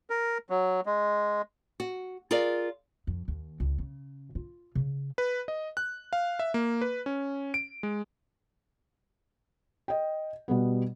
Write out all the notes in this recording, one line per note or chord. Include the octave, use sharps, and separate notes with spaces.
A#4
F#3
G#3
F#4
F4 G#4 A#4 D5 F5
F2
D#2
C#2
C#3
F4
C#3
B4
D#5
F#6
F5
E5
A#3
B4
C#4
D7
G#3
D#5 G5
B2 G3 B3